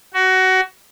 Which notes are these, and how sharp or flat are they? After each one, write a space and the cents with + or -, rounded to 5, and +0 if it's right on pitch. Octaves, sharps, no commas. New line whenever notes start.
F#4 +20